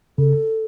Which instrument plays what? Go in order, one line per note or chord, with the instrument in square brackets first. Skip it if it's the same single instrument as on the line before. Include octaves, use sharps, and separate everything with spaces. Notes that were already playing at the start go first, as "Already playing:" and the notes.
[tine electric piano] C#3 [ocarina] A4